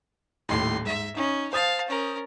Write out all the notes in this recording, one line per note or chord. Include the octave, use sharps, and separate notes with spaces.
D#1 D#2 A2 C6
G#2 E5
C#4 D#4
C5 F5 A5 D#6 A6
C#4 A#4